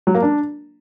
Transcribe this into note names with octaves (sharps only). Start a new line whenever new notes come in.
F#3
A#3
D4